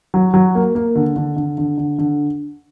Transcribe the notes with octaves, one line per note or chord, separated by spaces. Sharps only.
F#3
F#3
A#3
A#3
D3
D3
D3
D3
D3
D3